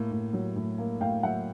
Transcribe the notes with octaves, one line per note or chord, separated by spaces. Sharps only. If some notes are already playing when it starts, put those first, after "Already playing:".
Already playing: A2 A#3
A2
F#3
A2
A#3
A2 F5 G5
F#3 E5 F#5